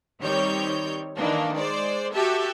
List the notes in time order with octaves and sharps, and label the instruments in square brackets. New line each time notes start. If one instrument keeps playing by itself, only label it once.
[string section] D#3 G3 C4 C#5 G6
D#3 E3 A#3 D4
G#3 C5 D5
F#4 G4 A4 E5